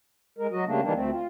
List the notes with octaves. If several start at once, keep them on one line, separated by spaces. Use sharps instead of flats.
G#3 A#4
F#3 F#4 D#5
C#3 G3 A3 A#3 D4
D#3 E3 G3 A#3 D4
D2 A3 C4
F4